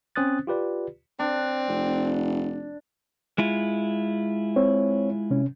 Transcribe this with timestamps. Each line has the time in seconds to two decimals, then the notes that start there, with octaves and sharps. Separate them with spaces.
0.16 C4 C#4 C5 D#6 F#6 A6
0.47 F4 G4 B4 D5
1.19 C4 D4
1.68 F1
3.38 G#3 E4 F4
4.56 C4 C#5
5.30 C3 C#4